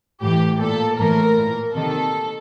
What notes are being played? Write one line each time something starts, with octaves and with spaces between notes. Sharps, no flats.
A2 E3 G4
A#2 A4
A2 E3 A#4
A#2
C3 D#3 A4